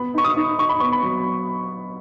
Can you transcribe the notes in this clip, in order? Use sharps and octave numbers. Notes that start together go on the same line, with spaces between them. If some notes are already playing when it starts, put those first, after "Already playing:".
Already playing: B3 B5
D#4 C#6
D#6
D#4
D#4 C#6
B5
B3 C#6
B5
F#3